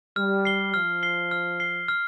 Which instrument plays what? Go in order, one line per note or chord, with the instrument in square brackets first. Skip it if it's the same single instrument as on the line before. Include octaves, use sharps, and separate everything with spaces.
[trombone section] G3 [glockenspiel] F6
[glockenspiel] C7 G7
[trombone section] F3 [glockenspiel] F6
[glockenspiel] C7 G7
F6
C7 G7
F6